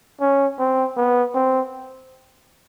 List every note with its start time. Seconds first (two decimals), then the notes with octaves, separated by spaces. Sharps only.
0.21 C#4
0.59 C4
0.97 B3
1.35 C4